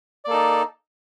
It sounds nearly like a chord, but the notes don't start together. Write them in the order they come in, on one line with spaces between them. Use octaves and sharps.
D5 A#3 A4 D#4